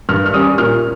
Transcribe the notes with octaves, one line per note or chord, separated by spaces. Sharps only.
G2 F6
F6
G3 C#4 D#6
A#2 F6